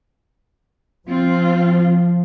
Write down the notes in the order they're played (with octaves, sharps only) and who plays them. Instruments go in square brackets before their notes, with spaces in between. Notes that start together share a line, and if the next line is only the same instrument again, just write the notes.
[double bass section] F3 [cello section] C4 F4